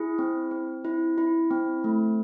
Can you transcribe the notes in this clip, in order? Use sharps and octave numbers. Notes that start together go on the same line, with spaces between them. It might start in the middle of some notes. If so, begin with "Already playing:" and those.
Already playing: E4 G#4
C4
C4
E4
E4
C4
A3